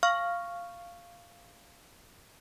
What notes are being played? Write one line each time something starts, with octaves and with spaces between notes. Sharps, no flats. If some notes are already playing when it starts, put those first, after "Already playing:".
F5 C#6 F6